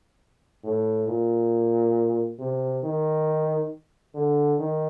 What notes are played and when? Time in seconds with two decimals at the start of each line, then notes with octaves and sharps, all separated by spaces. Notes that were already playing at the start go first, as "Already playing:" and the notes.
0.64 A2
1.08 A#2
2.39 C3
2.83 D#3
4.15 D3
4.59 D#3